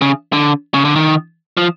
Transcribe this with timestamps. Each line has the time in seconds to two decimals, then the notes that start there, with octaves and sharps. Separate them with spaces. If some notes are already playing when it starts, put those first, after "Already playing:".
0.01 C#3
0.33 D3
0.74 C#3
0.85 D3
0.96 D#3
1.57 F3